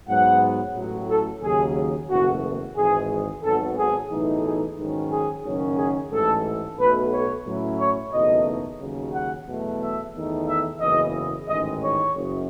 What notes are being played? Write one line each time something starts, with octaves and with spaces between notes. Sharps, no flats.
G#2 F#3 B3 F#5
A1 A2 F#3
A4
D#2 C#3 F#3 G#4
F#1 E2 B2 A3 F#4
G#1 G#2 E3 G#3 G#4
G#1 G#2 D#3 F#3 B3 A4
G#4
B1 A2 E3 A3 D#4
G#4
G#2 D#3 F#3 C#4
G#4
F#1 F#2 D#3 F#3 C#4
G#4
A1 G#2 E3 A4
B1 B2 A3 B4
C#5
A2 F#3 C#4 E4
C#5
F#1 E2 B2 A3 D#4 D#5
D#2 C#3 F#3 C#4
F#5
E2 B2 F#3 A3
E5
E2 D#3 A3 D#4
E5
F#1 E2 C#3 E3 B3 D#5
A1 G#2 D#3 G#3 C#4 D#5
C#5
F#1 F#2